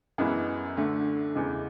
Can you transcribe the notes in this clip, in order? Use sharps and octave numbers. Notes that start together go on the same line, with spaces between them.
F#2 E3 G#3 B3 E4
D2 D3 A3
E2 C#3 E3 G#3